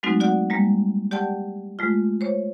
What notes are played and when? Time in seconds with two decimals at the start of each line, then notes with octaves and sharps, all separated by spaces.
0.03 F#3 G#3 A3 C4 D#4 F#4
0.20 F#4 D5 F#5
0.50 G3 G#3 A#3
1.11 G4 D5 F#5 G5 A5
1.79 G#3 A3 F4
2.21 C5 C#5